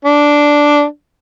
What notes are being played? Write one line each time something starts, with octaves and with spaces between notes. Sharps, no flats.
D4